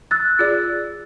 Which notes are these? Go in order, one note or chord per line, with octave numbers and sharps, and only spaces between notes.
E6 F#6 A6
F4 G#4 D5